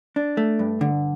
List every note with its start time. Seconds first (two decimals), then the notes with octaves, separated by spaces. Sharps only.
0.16 D4
0.37 A3
0.59 G2
0.81 D3